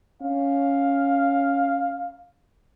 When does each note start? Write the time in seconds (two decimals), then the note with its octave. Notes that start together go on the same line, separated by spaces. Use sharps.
0.22 C#4 F5